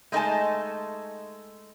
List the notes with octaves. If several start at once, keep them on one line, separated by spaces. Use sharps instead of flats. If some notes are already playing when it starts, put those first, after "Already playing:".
G#3 A3 D#4 A#4 G#5 A5